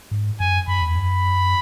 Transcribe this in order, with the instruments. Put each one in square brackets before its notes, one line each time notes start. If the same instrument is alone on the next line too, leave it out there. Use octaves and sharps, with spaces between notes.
[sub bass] G#2
[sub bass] F#2 [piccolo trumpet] G#5
[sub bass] F#2 [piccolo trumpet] B5
[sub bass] E2
[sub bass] F#2 [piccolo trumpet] B5